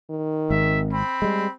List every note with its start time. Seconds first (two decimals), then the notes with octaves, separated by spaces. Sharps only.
0.10 D#3
0.50 G#1 E5
0.92 C4 B5
1.22 G3 G#3